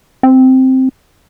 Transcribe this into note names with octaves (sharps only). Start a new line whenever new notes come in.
C4